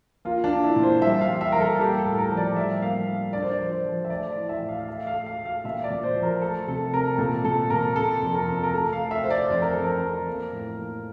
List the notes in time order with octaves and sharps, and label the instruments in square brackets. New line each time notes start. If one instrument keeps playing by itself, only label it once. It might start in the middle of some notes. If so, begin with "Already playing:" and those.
[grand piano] A#3 F4
D4
A#3
E4
A#2
C5
G3 E5
F5
G3
E5
G3 A#4
A4
A4
A#3 G4
A4
A2
A#4
F3
D5
G3 E5
A#3 F5
A#3
D3 D5
C5
D5
F3
C5
F3
E5
A3 D5
E3
E5
A2
F5
F5
A3 E5
F5
A3
F5
A3
F5
A#2 E5
D5
A#2
C5
F3
A#4
A3 A4
C3 A4
C3 A#4
A#2 A4
A#2 A4
A#2 A#4
C3 A4
F2
A#4
F2
A#4
A3 A4
F5
A3
E5
A3 C5
D5
F2 C5
A#4
F2 A4
A#4
F2
A#3
A2
A#3